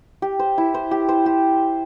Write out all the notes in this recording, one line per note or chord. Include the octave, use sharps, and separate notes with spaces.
G4
C5
E4
C5
G4
C5
G4